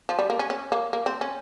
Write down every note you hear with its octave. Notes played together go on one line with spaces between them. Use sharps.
F3
G3
A#3
C#4
C#4
A#3
A#3
C4
C#4